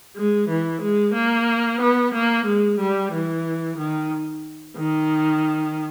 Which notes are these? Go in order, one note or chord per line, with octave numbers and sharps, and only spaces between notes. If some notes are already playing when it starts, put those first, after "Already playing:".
G#3
E3
G#3
A#3
B3
A#3
G#3
G3
E3
D#3
D#3